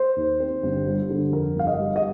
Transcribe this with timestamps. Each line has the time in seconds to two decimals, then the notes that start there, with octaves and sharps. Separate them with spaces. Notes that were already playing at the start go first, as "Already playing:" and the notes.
Already playing: C5
0.16 D#2
0.40 C4
0.63 G1
0.87 G3
1.09 D3
1.32 F2 A#4
1.56 G1 F5
1.67 D#5
1.79 G3
1.96 D#5